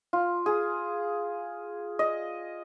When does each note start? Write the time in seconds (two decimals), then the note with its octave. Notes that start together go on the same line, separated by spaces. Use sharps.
0.13 F4
0.46 G#4
1.99 D#5